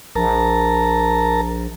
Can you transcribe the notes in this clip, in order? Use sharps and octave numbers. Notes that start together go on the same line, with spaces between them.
A#1 A#4 A5 A#5